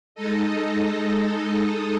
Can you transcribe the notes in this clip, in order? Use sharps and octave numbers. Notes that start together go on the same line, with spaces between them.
G#3 D#4 A4 D#5